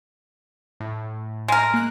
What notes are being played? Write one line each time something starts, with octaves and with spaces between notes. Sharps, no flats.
A2
G#3 A#4
A#3 F#6